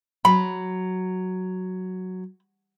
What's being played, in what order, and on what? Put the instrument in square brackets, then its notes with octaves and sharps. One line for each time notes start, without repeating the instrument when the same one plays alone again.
[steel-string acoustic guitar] F#3 [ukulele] B5